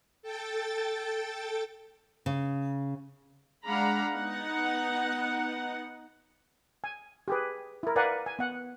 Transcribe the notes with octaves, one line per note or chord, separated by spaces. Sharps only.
A4 G5 A6
C#3
G#3 D4 F5 F#5 A#5 B5
B3 D#4 F#5
G#5
G4 G#4 B4
E4 A#4
A#4 B4 D5 F5 F#5 G#5
G#5
B3 F#5